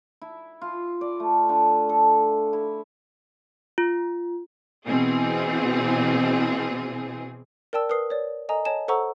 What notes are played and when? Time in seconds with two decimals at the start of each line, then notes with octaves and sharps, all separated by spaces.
0.22 E4
0.61 F4
1.01 D5
1.20 A3
1.49 D3
1.89 A4
2.53 E4
3.78 F4
4.87 B2 E3 C4 G#4
7.73 A#4 D5 G5 A5 E6
7.90 A#4 B4 D#6 C7
8.10 C#5 D5
8.49 A4 D#5 G#5 A#5 D#6
8.65 C#5 D#5 G#5 A5 E7
8.88 A4 C5 F#5 A#5 C#6 E6